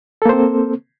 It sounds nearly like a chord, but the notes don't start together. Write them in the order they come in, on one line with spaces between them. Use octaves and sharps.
A4 A#3 C5 C4